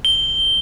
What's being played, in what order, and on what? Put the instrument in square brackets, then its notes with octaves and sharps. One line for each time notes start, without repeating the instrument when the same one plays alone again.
[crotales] G7